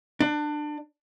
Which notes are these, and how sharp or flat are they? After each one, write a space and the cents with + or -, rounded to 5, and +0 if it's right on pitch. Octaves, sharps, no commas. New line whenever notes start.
D4 +25